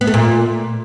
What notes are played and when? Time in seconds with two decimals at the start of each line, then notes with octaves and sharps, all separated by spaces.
0.01 B3
0.07 A3
0.14 A#2